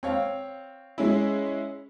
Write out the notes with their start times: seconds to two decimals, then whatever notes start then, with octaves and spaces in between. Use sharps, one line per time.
0.03 C4 C#5 F5
0.98 G#3 C#4 E4